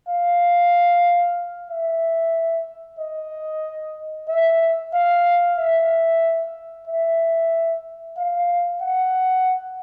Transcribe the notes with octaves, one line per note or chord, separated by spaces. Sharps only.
F5
E5
D#5
E5
F5
E5
E5
F5
F#5